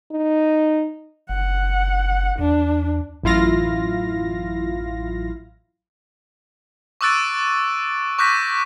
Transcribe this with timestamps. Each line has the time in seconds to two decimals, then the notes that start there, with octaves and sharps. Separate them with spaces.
0.12 D#4
1.29 F#1 F#5
2.39 E2 D4
3.23 A1 F#2 E4 F4 F5 A#6
7.01 C#6 D6 E6 F#6 A6 D7
8.19 C#6 D6 F#6 G6 A#6 B6